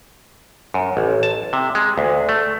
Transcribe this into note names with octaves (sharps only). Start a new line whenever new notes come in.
F#2
A1
A5
C3
G#3
D2
A3